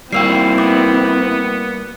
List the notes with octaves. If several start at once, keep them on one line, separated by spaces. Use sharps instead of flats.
G3 A#3 C4 E4 F#4 G5 E6 C7
B3 D6